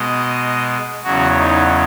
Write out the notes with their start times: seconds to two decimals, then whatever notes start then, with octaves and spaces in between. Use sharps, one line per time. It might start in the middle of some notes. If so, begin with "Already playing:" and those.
Already playing: B2 G#3 D#5
1.04 E2 C#3 F#3 F#4
1.38 D#4